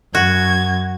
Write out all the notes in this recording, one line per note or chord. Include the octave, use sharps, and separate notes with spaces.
F#2 F#4 G#6